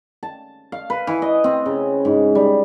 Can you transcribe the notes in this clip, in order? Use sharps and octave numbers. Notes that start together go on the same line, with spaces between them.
A5
F5
B4
E3
D#5
C4
C#3
G#2
G3